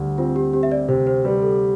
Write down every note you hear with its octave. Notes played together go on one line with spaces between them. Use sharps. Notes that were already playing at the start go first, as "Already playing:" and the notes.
Already playing: D2 G3
C4 F4
G4
C4 G4
E5
D5
C3 C5
C5
G3 B4
A4